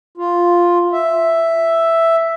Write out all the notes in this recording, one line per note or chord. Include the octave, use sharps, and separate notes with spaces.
F4
E5